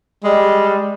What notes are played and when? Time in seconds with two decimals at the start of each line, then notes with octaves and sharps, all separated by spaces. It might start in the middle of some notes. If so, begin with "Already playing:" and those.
0.24 G3 G#3